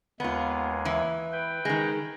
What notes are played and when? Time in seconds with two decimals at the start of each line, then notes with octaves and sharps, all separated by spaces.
0.20 D#2 G#3 B3 F4
0.85 E3
1.32 B4 G5
1.65 D#3 G#3